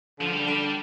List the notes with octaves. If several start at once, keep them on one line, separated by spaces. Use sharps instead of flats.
D3 F3
G3
D3